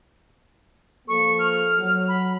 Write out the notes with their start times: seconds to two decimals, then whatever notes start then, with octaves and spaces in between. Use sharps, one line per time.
1.08 F3 A#3 A4 C#6
1.39 F6
1.79 F#3
2.08 B5